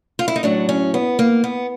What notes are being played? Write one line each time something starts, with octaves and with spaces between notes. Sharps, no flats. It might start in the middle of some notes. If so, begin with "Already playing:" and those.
F4
E4
D#4
A2 F#3 D4
C#4
B3
A#3
B3